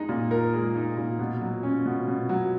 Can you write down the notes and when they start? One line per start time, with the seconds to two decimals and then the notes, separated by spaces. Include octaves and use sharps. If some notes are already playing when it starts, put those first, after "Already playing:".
Already playing: G#3 D#4
0.09 A#2
0.31 A#4
0.53 G#3
0.76 D#4
0.97 A#2
1.19 B2
1.41 F#3
1.63 C#4
1.86 B2
2.08 B2
2.29 F#3